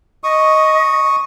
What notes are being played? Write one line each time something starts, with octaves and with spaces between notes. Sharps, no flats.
D#5 C#6 D#6